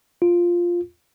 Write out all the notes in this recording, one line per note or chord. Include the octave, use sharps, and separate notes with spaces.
F4